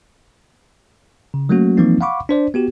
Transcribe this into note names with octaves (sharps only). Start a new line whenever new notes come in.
C#3
F#3 A3 A#3 C#4 F#4
E3 F3 G3 A#3 C4 D#4
F5 F#5 B5 C#6 D6
D4 C5 D5
B3 F#4 G4